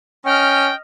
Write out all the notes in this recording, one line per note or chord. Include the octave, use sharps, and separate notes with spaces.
C#4 D#5 G5 F6